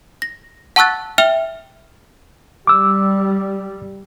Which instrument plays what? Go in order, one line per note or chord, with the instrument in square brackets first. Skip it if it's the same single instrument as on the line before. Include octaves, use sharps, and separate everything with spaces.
[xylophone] A#6
F#5 A5 C#6 E6 F#6 A6
E5 G5 F6 F7 G7
[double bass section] G3 [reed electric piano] D6 E6